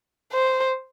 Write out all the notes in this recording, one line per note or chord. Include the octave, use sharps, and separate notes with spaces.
C5